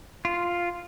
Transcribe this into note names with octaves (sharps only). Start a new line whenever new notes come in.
F4